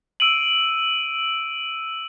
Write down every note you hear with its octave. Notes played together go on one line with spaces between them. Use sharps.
E6 D7 D#7 F#7